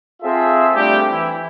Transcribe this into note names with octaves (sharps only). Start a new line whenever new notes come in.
C4 F4 G#4 A4 E5
G3 A3 C4 D4 G4
E3 E4